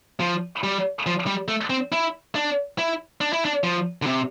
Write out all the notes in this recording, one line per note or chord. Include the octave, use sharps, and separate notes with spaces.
F3
G3
F3
G3
A3
C4
E4
D4
E4
D4
E4
D4
F3
D3
C3